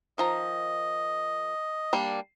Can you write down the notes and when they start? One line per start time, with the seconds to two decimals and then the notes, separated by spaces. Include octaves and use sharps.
0.18 D#3 F3 D#5 A#5
1.93 G3 A#3 D4